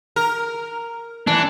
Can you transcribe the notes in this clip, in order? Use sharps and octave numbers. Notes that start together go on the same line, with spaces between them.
A#4
E3 D4